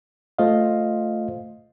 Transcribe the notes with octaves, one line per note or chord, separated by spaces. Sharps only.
A3 F4 C5 D#5 F5